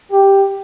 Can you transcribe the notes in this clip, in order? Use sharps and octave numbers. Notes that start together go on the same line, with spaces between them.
G4